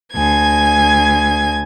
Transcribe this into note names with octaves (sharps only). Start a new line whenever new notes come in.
D2 G#5 G#6